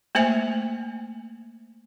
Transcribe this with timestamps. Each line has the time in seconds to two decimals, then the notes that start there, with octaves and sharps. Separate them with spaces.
0.15 A3 A#3 C5 E5 G#5